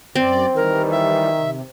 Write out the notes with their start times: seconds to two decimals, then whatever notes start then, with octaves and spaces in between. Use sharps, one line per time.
0.15 F#2 C4 D5
0.56 D#3 E3 G3 A#4
0.91 E5
1.38 C3